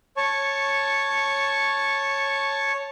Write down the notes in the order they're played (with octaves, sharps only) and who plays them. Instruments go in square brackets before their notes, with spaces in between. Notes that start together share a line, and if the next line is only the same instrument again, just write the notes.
[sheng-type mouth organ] C#5 A5 C#6